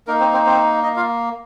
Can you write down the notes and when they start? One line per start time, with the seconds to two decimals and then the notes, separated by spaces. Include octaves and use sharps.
0.07 A#3 D#4 A#4
0.20 C4 C5
0.33 C4 C5
0.46 C4 C5
0.83 D#4 D#5
0.96 F4 F5